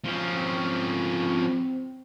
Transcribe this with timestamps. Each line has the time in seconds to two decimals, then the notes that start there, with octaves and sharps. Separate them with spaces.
0.04 F3 C#4
0.36 C4